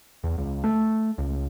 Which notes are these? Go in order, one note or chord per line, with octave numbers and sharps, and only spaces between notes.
E2
C#2
A3
C#2